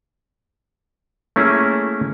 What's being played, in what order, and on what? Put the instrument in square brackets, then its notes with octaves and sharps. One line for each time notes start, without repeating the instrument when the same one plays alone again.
[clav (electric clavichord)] A3 A#3 C#4 E4 G#4